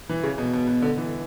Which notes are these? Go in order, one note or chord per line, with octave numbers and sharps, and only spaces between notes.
E3
C#3
B2
B2
B2
D3
E3